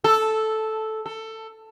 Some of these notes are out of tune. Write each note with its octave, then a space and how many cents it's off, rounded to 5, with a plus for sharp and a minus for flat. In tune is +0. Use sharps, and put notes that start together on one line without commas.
A4 -5
A4 +15